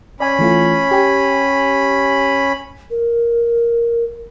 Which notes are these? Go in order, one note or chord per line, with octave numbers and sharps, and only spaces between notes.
C#4 D5 G#5 B5
E3 A3 F4
G4 G#5
A#4